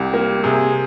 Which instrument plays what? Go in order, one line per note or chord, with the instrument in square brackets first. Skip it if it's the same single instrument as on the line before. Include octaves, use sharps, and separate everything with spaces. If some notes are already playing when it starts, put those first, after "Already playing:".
Already playing: [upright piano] C2 [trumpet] G4
[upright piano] A#3
[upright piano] C3 [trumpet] G#4